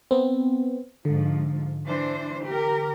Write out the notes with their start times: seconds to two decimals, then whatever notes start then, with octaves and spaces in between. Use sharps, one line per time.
0.11 B3 C4
1.05 G#2 D3 F3
1.86 E3 D4 C5
2.45 G4 A#4